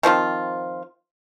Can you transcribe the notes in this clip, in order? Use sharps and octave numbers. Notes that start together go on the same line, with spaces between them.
D#3 F3 C4 F4